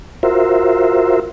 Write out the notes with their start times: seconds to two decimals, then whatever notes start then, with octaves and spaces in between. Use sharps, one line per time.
0.23 F4 F#4 A#4 C5 E5